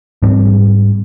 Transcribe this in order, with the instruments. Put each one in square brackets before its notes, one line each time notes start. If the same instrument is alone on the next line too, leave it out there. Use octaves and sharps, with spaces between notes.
[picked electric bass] G#2 G3 C4